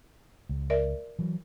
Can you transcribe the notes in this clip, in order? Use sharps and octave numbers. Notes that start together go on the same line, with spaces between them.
C#2
A#4 D5 E5
E3 F#3